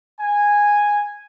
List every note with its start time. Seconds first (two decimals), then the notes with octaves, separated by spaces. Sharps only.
0.19 G#5